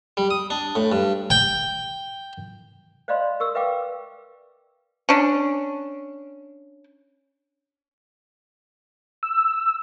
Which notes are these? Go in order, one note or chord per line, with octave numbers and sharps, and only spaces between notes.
G3
D#6
D4
A2
G2
G5
C5 D5 D#5 F5 B5 C6
A#4 C#6 D#6 E6
B4 E5 F5 G5 D6
C#4 D4
E6